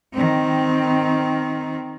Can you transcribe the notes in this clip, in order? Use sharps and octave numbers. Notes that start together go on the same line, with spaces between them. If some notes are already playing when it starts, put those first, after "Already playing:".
D#3 C4